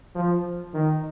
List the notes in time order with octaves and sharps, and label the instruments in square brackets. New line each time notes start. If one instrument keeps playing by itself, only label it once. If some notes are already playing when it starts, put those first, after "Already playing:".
[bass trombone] F3
D#3